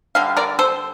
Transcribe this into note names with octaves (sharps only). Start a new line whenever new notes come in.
D3 G3 F5
A#4 D5
A4 C5